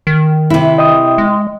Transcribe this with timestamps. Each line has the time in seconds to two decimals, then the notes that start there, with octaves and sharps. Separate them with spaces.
0.07 D#3
0.50 C3 E4
0.78 D#5 G5 D#6
1.18 G#3